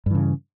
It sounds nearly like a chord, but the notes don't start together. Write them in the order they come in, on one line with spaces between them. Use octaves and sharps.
G2 E3 C#3